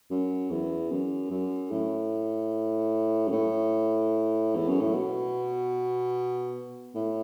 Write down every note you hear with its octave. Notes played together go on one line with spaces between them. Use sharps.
F#2
E2
F#2
F#2
A2
F#2
A2
E2
F#2
A2
B2
A2